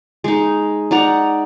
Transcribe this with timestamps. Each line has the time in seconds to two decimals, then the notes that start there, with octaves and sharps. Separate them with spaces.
0.24 G#3 D#4
0.91 D#4 D5 F#5 A#5